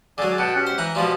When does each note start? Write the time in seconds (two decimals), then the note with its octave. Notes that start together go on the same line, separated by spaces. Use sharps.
0.18 D3 F#3 G#4 D5 D6
0.38 B2 F#5 G5 A5
0.55 C#4 G4 F#5
0.67 C5
0.78 E3 F#5 A#5
0.95 B2 F3 G3 F4 G#5